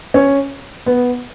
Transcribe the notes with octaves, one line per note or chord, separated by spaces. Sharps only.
C#4
B3